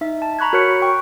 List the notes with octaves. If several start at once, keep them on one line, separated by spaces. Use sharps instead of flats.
D#4 E5
A5
A#5 B5 C#6 F#6 G#6
F#4 A#4 C#5 F#6 C#7
G5 C#6